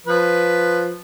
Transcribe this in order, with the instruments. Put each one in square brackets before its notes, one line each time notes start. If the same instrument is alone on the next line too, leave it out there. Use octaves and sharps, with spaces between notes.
[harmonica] F3 B4